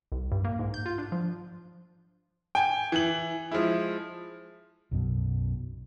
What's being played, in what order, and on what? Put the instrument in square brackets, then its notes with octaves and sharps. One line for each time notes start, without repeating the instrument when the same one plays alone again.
[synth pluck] C2
G2
A#3
G#2
G6
F4
D4
F3
[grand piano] G5 G#5
E3 F#7
F3 G#3 E4
[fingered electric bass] B1 F#2 B2